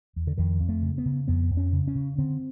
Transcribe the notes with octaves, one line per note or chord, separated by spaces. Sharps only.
E2
D3
F2 D#3
F2
A3
C#3
B3
C#3
F2 B3
F2
C#4
C#3
C#4
C#3
D3 C4